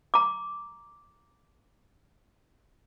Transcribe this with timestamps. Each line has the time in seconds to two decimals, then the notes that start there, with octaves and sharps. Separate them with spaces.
0.14 A#5 D6